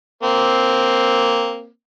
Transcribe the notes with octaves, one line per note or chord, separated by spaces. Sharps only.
A#3 C4